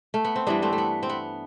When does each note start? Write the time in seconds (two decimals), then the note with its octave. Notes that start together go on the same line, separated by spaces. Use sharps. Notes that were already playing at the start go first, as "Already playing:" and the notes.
0.14 A3
0.25 B3
0.36 C4
0.47 G2 E3 G3 B3 D4
0.62 A3 C4
0.73 A3
0.78 B3
1.03 C4
1.09 B3